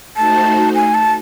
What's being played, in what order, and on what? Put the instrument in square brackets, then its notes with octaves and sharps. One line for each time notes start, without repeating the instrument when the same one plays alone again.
[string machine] A3 D#4 F#4 C5 [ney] A5
[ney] G#5
A5